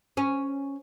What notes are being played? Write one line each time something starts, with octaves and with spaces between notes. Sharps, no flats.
C#4